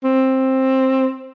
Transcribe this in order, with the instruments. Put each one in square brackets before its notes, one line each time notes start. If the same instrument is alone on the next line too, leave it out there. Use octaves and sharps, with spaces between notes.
[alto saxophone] C4